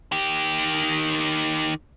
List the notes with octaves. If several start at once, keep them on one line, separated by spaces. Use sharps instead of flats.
D#3 G4